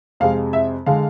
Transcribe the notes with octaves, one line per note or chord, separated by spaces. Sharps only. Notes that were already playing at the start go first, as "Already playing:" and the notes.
F2 C3 G#3 F5
E5
D3 G#3 F5